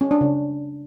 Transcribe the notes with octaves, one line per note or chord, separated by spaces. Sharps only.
C#4
D4
C#3